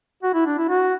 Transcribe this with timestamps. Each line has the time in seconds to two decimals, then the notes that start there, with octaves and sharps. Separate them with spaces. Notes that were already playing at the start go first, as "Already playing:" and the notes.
0.23 F#4
0.34 E4
0.46 D4
0.58 E4
0.69 F#4